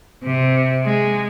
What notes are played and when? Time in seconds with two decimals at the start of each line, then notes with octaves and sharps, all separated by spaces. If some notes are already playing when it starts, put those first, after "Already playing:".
0.24 C3
0.85 G#3